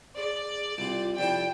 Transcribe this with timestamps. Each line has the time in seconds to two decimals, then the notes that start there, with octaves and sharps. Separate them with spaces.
0.17 G#4 D5
0.78 C2 C3 F4
1.19 F2 C3 E4 D5 G5